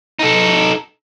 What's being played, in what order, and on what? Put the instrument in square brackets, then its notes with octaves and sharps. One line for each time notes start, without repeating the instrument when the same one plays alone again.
[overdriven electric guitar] D#4 A4